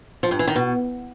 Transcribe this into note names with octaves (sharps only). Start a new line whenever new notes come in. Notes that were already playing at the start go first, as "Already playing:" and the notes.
F3
G2
E3
D#3
B2